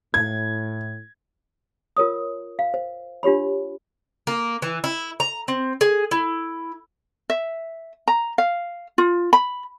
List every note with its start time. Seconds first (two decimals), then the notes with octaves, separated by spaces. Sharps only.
0.14 A2 G#6
1.97 F4 A#4 C#5 D#6
2.59 F5
2.74 C5
3.23 D4 F4 G4 C#5 B5
4.27 A#3
4.62 E3
4.84 E4
5.20 A#5
5.48 C4
5.81 G#4
6.11 E4
7.30 E5
8.08 A#5
8.38 F5
8.98 F4
9.33 B5